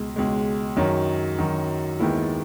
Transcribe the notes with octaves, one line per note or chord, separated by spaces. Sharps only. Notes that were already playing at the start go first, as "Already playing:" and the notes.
Already playing: C#2 B2 G#3
C#2 B2 G#3
F#2 D#3 F#3
F#2 D#3 F#3
D#2 D#3 G#3 B3 E4